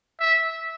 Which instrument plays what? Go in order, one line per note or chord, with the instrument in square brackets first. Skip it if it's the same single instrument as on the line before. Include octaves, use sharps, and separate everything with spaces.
[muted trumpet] E5